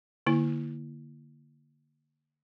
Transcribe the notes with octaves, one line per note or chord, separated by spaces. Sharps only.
D3 A#3 E4